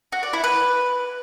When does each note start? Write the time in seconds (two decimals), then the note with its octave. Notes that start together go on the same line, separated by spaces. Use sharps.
0.12 F#4
0.23 D5
0.33 E4
0.44 B4